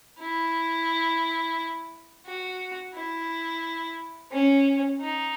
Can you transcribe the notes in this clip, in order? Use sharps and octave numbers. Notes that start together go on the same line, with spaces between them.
E4
F#4
E4
C#4
D#4